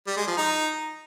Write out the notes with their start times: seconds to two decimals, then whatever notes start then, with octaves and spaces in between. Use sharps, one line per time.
0.07 G3
0.17 G#3
0.27 F3
0.37 D#4